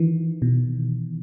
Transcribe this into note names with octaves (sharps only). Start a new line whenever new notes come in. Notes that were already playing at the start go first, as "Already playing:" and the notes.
Already playing: D#3 E3
B2